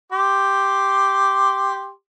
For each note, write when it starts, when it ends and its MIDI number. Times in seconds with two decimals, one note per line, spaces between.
0.12 1.90 67
0.12 1.90 84
0.12 1.90 86